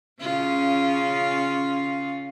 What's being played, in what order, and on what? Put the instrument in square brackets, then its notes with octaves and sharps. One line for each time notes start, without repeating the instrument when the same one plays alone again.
[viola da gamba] C#3 C#4 F4